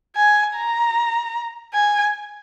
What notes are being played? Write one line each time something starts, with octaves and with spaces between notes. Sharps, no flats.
G#5
A#5
G#5